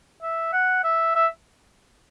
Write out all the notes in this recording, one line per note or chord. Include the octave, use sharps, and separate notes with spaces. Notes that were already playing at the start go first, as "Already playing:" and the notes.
E5
F#5
E5
E5